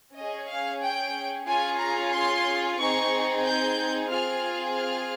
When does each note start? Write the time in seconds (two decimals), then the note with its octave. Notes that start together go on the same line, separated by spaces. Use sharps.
0.16 C#4 G#4 D#5
0.50 F5
0.82 G5
1.48 C#4 F4 G#4 G#5
1.80 A#5
2.13 C6
2.79 C4 D#4 G#4 C#6
3.45 G6
4.10 C4 F4 G#4 F6
4.76 F6